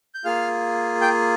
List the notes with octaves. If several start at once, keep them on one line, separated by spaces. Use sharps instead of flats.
G6
A#3 F4 G#4 F5 F6
G5 G6